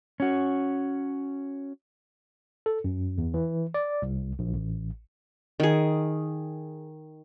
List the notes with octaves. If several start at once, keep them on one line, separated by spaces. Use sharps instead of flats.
C#4 F#4
A4
F#2
E2
E3
D5
C2
A#1
A1
D#3 G#4